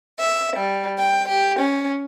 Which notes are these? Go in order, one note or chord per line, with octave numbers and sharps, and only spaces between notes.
E5
G3
G5
G4
C#4